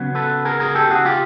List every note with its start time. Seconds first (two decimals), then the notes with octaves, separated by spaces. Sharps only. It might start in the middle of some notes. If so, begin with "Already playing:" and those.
Already playing: C#3 F#3 B3
0.15 A4 B4
0.45 G#4 A#4
0.60 G#4 A#4
0.75 G4 A4
0.90 F#4 G#4
1.05 F4 G4